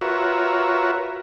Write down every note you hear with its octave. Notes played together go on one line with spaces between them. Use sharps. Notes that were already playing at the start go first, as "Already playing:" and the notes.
F4 F#4 A#4 B4 C#5 E5